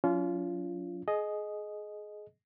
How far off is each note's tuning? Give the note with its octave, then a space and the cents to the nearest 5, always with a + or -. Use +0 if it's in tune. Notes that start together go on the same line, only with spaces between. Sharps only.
F#3 -35 C#4 +40 F4 -15
G#4 +25 D#5 +0